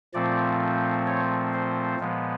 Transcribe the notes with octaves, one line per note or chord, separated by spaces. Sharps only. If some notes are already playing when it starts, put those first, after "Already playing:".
A#2 F3 A3 C4 D5
C#5
C5
A#2 F3 G#3 B3